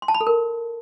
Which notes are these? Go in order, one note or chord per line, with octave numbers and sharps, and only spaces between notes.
C6
A5
B5
A4
A#4